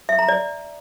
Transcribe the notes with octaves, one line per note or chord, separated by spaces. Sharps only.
E5
A#5
D5